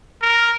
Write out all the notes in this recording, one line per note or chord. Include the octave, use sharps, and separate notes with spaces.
A#4